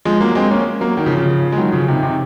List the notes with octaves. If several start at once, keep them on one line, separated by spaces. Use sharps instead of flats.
F3 G#3
F#3 A#3
G#3 C4
A#3 C#4
F#3 A#3
D#3 F#3
C#3 F3
C#3 F3
G#3
D#3 F#3
C#3 F3
C3 D#3
C3 D#3